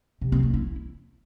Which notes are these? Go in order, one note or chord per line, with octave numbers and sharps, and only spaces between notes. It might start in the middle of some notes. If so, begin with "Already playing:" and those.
C3
C4
A#3
E4